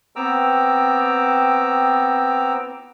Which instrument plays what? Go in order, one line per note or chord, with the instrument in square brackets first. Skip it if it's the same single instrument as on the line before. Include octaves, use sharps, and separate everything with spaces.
[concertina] B3 C4 G5 A#5 D6 E6